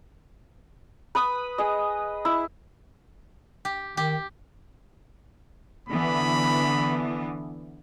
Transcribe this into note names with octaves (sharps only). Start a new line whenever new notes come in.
B4 B5 D#6
G#4 D#5
E4
G4
D#3 G4
D3 E3 B3 B5